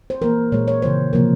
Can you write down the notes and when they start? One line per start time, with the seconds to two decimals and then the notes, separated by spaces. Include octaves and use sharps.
0.10 C5
0.21 E3 A#3 A#4
0.52 A#2 G#3 C#5
0.68 C#5
0.82 C#3 E3 G#3 C5
1.13 C3 F3 A#3 A#4